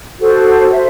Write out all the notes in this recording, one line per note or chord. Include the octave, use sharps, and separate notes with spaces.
F#4 A4 C5
C5 E5